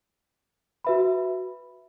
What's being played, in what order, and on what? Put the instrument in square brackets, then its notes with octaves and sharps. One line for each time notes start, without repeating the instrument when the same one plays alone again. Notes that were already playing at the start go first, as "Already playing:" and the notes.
[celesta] F#4 B4 E5 B5